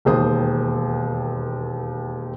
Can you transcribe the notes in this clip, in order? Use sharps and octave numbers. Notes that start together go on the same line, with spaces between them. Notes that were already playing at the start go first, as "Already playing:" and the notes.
E1 D#2 C5 D#6